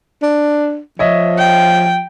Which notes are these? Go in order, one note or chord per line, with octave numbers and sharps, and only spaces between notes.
D4
F3 C#5 D#5 E5
G5